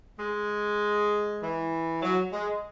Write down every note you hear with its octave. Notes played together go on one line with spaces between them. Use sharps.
G#3
E3
F#3
G#3